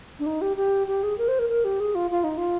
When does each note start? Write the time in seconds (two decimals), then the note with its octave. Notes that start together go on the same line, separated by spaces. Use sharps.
0.19 D4
0.26 D#4
0.41 G4
0.57 G4
0.87 G4
1.03 G#4
1.18 A#4
1.28 C5
1.39 A#4
1.49 A#4
1.64 G4
1.80 G#4
1.95 F4
2.11 F4
2.24 D#4
2.38 F4